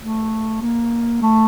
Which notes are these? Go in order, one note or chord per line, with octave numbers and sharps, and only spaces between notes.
A3
A#3
A3